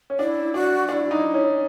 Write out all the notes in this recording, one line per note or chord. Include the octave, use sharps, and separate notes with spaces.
C#4
D4 E4
D4 F#4
D4 E4 F#4
D#4
C#4